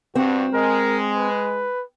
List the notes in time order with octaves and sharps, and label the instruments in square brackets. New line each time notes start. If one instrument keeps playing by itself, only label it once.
[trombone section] G2 F#4 [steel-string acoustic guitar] C4
[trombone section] G#3 [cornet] A#4
[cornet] B4